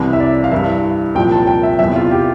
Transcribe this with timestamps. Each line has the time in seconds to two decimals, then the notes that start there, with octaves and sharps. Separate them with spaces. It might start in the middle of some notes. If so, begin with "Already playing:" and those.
Already playing: C2 C3 E3
0.13 E5
0.20 D5
0.44 F5
0.52 G2 E3 E5
1.15 C2 A#2 F3 G5
1.32 A5
1.47 G5
1.63 E5
1.79 E2 C3 E3 E5
1.96 F4
2.11 G4